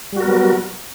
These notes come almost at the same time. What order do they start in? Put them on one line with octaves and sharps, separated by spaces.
G3 F#4 A#4 B3 F#3